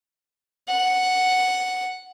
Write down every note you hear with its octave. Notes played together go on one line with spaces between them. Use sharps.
F#5